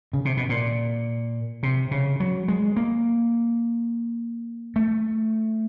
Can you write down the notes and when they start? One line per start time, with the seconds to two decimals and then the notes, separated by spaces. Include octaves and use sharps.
0.13 C#3
0.25 C3
0.37 B2
0.49 A#2
1.63 C3
1.91 C#3
2.20 F#3
2.48 G#3
2.76 A#3
4.76 A3